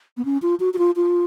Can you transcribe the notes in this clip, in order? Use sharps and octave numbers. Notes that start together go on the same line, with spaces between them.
B3
C#4
F4
F#4
F#4
F4
F4